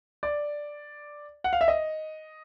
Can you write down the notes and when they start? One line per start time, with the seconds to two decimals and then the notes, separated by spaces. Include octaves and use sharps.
0.23 D5
1.44 F#5
1.53 F5
1.61 E5
1.68 D#5